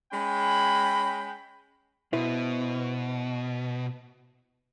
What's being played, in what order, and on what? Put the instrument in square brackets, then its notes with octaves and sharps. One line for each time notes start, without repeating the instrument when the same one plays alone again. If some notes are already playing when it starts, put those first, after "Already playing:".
[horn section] G#3 C#4 G5 B5
[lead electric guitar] B2 [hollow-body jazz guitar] E4 B4 C5